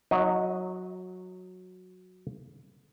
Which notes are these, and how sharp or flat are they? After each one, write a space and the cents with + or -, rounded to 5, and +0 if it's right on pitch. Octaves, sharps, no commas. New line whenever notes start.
F#3 -15 D#4 +35 D#5 +0